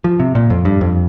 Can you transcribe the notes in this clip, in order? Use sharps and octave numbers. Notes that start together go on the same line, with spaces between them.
F3
C3
A#2
F2
G2
F2